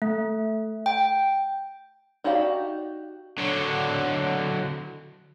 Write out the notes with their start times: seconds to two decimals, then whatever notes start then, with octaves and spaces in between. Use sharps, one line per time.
0.02 A3
0.86 G5
2.24 D#4 F#4 G4 D5 F5
3.38 D3 F#3